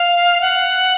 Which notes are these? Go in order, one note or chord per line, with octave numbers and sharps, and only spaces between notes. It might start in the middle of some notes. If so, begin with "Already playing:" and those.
Already playing: F5
F#5